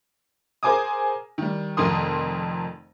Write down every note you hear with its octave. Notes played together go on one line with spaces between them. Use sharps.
G#4 A#4 C5 G#5 D6 D#6
D#3 G3
F1 F2 D#3 A#4 C6 D#6